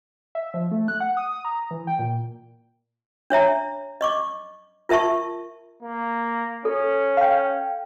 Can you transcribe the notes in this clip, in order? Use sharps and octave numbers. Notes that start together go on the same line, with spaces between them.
E5
F3
A3
F#6
F#5
D#6
A#5
E3
G5
A#2
D4 C#5 E5 A#5
D#5 C#6 D6
F4 A#4 E5 A5 C#6
A#3
C#4 A4
F5 G5